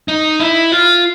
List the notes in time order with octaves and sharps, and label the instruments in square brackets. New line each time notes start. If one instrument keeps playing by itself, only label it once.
[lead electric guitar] D#4
E4
F4